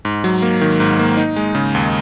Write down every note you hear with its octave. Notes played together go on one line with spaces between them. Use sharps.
G#2
F#3
A#3
D#3
G#2
A#3
D#4
G#3
C#3
D#2